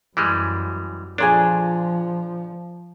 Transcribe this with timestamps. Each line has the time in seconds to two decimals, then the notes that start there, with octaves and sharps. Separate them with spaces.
0.17 F#2 E3 G3 G#3
1.18 A#2 F3 D4 G#4 A4 C#5